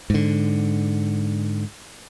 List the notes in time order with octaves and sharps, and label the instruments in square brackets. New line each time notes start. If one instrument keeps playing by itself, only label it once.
[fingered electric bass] G#2 D3